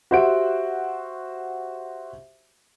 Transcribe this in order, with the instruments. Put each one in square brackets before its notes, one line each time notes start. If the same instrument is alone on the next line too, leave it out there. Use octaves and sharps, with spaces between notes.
[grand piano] F#4 G4 C5 E5 F#5 D7